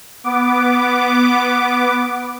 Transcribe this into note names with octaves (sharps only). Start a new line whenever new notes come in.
B3 D6